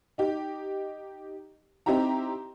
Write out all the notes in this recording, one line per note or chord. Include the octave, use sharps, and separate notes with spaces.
D#4 G4
C4 D#4 E4 G4 A#5